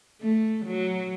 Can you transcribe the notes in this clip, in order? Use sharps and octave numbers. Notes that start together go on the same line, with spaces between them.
A3
F#3